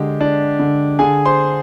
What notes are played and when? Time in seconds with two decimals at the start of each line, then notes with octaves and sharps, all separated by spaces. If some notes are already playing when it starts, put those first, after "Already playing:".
Already playing: D3 G#3 G4
0.21 D4
0.59 D3
0.99 D3 G#4 G#5
1.25 C5 C6